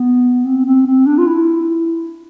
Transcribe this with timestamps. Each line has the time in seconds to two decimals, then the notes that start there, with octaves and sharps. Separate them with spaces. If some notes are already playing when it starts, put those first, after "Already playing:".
Already playing: B3
0.45 C4
0.65 C4
0.86 C4
1.06 D4
1.18 F4
1.27 E4